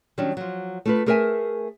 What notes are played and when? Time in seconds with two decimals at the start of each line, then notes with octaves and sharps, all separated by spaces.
0.18 D#3 F#3 G3 C#4 D4
0.37 F3 F#3
0.86 A3 F4 B4
1.06 A3 G#4 A#4 B4 E5 G#5